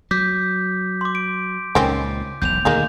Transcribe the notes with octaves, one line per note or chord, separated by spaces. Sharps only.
F#3 D6 G6 B6
C6 D6
D7
C#2 A#2 D#3 C4 C#4
E1 B1 G6 F7
D2 A#2 D#3 A#3 D#4 G#4